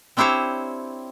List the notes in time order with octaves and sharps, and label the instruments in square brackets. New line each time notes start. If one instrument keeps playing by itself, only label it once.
[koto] C4 D4 E4 G4 C5 C#5